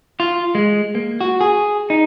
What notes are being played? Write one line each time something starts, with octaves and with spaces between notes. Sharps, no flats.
F4
G#3
A#3
F#4
G#4
D#4